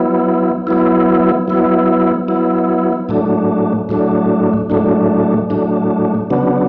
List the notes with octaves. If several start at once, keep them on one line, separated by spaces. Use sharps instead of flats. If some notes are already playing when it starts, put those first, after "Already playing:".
Already playing: F#3 B3 E4
F#3 B3 E4
F#3 B3 E4
F#3 B3 E4
A2 F#3 A3 D4
A2 F#3 A3 D4
A2 F#3 A3 D4
A2 F#3 A3 D4
C#3 F#3 B3 D4